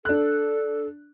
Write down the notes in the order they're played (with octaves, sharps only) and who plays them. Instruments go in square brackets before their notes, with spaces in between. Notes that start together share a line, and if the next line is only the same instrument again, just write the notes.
[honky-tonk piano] D4 F#6 [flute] A4